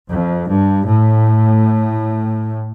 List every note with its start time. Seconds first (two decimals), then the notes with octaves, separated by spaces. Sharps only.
0.11 F2
0.50 G2
0.89 A2